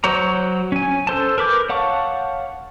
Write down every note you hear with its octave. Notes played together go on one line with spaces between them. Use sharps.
F#3 C5 C#5 A#5
C#4 G#5
A4 C5 A5
A#4 B4 D6 G6
C#5 F5 F#5 A5 C#6